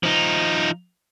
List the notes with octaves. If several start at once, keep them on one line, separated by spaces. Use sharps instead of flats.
F3 D#4